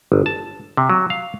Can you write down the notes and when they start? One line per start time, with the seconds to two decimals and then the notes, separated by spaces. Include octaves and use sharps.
0.12 G1
0.26 A5
0.77 C3
0.90 F#3
1.10 F5